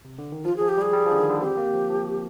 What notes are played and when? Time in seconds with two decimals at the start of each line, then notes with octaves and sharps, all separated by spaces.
0.05 C3
0.19 D3
0.32 D#3
0.45 F3 F4
0.57 F3 G#4
0.69 G4
0.78 G3
0.82 G#4
0.93 G3
1.06 F3
1.12 D3
1.17 D#3
1.30 D3
1.41 C4 G4
1.57 A#3
1.74 F3
1.90 F3